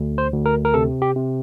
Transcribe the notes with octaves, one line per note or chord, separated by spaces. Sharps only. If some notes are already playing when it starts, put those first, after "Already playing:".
Already playing: D2
C5
D2
A#4
A#4
C3 A4
G4
C3